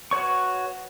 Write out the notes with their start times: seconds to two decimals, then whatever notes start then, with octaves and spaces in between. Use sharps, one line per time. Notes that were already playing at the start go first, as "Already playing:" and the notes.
0.11 F#4 B4 C#5 C#6